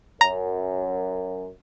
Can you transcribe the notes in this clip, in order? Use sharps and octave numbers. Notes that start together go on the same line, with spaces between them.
F#2 A#5